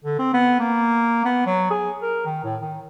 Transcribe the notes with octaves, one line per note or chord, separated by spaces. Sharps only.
D3
C4
B3
A#3
B3
F#3
G#4
A#4
D#3
A2
D#3